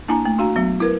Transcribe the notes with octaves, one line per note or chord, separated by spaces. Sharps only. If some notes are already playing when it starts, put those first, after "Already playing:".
A#3 D4 E4 G#5 A#5
A3
D4 F#4 F5 A#5
F#3 B3
E4 A#4 B4